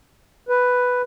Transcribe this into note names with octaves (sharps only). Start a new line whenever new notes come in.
B4